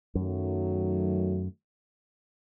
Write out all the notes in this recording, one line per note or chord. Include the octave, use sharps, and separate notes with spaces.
F#2 D#3 F#3 A3